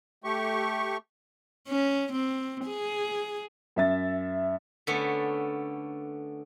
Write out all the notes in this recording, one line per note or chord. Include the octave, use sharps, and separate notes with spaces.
A3 G4 C#6
C#4
C4
G#4
F#2 E5 A6
D3 A3 B3 C#4